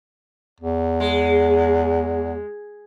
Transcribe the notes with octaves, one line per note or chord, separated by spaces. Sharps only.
E2
G#3